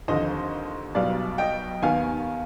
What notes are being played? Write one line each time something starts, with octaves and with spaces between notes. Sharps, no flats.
D#2 D3 F3 C4 C5 D#5
B1 B2 G3 B3 D5 F5
D#5 G5
D#2 D#3 B3 F5 G#5